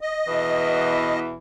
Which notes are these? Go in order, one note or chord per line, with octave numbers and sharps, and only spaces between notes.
D#5
E2 B2 E3